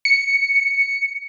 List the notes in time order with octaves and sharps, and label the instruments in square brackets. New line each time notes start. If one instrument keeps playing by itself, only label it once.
[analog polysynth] C#7